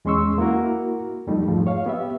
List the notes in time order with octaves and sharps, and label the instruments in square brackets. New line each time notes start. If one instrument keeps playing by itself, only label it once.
[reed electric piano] E2 G#3 C#4 C6 C#6 E6
A#3 E4 F#4 A#4
F2 F3 G3 A3 D#4
G#2 F3 G#3 A3
C#5 F5
B3 G4 E5